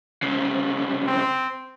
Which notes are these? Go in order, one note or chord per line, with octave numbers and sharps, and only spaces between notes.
C2 C#3
C4